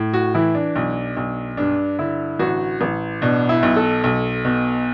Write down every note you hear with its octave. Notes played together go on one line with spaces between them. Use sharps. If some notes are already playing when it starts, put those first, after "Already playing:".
Already playing: A2
F#4
E3 E4
D4
B1
B1
G2 D4
D3 E4
A1 F#4
A1
B2 D4
E4
B1
A4
B1
B2